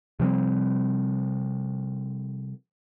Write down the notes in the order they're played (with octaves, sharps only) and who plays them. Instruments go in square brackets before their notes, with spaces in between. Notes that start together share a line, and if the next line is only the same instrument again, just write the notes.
[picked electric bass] C3 F3 G3 C4